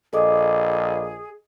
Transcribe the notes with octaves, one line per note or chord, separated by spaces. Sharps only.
A#1 G#4 A4 D#5 D6